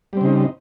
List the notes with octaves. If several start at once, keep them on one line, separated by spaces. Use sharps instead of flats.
C#3 G3 C4 D#4